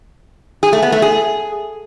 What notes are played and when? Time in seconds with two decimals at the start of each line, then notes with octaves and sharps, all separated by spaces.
0.63 G#4
0.73 A3
0.82 B3
0.92 A3
1.02 G#4